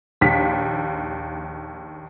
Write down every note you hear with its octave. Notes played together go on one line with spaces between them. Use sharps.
A#1 D#2 B6